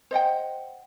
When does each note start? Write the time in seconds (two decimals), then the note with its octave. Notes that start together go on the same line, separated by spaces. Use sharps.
0.11 C5 D#5 F#5 G5